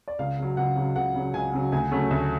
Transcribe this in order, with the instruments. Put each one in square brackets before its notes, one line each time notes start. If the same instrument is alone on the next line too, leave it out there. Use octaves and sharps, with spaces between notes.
[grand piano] D5
C#2 F5
C#3 F#3
C#2 F#5
C#3 F#3
C#2 F#5
C#3 F#3
C#2 G#5
C#3 F#3
D2 G#5
C#3 F#3 A3 C#4
D2